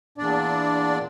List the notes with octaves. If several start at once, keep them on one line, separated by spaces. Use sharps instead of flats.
E2 A#2 D4 D5